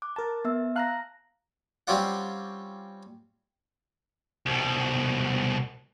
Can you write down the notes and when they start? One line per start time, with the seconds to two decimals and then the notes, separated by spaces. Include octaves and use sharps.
0.02 D6 F#6
0.16 A#4 A5 A6
0.45 B3 E5 E6
0.76 F5 A5 A#5 F#6 A#6
1.87 G3 C4 C#4 F4 D5 F#5
4.46 C2 B2